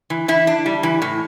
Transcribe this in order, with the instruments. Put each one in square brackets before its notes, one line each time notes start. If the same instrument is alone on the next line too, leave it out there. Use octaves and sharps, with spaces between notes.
[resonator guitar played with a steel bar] E3
E3 E4
D4
G3
E3
A2